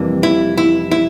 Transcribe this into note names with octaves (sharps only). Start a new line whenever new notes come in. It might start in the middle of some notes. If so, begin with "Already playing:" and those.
Already playing: F2 C3 E3 G3 A#3
E4
E4
E4